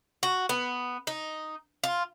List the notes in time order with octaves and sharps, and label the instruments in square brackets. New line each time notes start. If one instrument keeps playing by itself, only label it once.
[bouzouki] F#4
B3
D#4
F4